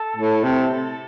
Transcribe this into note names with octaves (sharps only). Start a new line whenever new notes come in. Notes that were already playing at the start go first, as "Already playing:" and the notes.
Already playing: A4
A2
C3